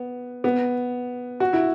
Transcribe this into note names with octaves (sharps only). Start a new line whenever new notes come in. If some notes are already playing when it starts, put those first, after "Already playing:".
Already playing: B3
B3
F#4
E4